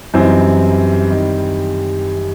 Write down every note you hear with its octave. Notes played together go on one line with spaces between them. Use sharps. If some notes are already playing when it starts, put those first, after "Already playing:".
F#2 E3 G3 C4 D#4 E4
D#3 G3 D#4